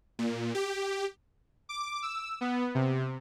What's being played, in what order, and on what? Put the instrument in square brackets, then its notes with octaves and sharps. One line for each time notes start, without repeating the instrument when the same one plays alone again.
[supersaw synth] A#2
G4
D6
E6
B3
C3